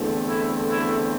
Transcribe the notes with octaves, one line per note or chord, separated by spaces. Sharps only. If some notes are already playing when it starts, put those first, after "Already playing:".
Already playing: E2 D3 A3 C4
E4
E4